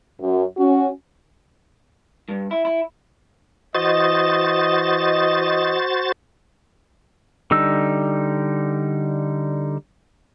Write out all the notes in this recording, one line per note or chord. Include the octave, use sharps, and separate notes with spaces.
F#2
C#4 F#4
G2
E4
E4
E3 F#4 C5 D#5 A6
D3 G3 D#4 E6